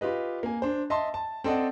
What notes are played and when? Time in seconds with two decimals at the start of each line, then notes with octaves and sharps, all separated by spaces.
0.01 F4 G4 B4 D#5
0.43 A#3 G#5
0.62 D4 C5
0.90 D#5 E5 A5 C6
1.14 A5
1.44 C4 A4 D5 D#5 F#5